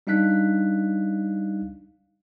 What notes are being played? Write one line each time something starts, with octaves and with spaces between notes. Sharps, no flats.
G3 D4 D#4 F5 F#6 B6